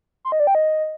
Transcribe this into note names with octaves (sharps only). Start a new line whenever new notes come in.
C6
D#5
D5
G5
D#5